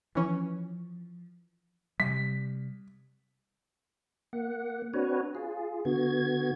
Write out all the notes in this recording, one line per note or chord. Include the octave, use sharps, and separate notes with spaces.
E3 F3 C#4
C3 G3 B6
A#3 F#5
C4 D4 F#4 B4 C#5
F4 G#4
D3 B3 F#4 G#6